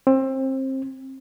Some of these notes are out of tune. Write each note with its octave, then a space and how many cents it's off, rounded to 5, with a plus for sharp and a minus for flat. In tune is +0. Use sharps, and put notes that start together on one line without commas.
C4 +25